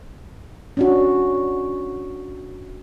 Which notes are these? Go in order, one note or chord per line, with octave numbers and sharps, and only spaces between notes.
C#4 D4 F#4